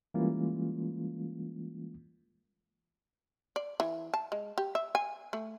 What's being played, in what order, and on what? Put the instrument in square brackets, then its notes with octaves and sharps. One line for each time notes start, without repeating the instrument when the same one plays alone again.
[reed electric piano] E3 G3 G#3 A#3 C#4 F4
[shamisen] D5
E3
A5
G#3
G4
E5
G#5
A3